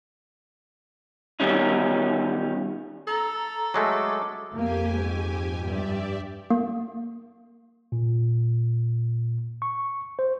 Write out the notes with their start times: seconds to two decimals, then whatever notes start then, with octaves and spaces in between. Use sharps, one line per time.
1.40 B2 D#3 G3 C#4 D#4
3.08 A4 A#5
3.74 F#3 G#3 A3 D6
4.52 F2 A#3 G4 G#5
4.95 G#2
5.63 G2 G4 D5 E5
6.50 A#3
7.92 A#2
9.62 C#6
10.19 C5